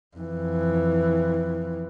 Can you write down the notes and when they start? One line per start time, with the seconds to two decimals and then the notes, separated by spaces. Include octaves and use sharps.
0.17 F2 E3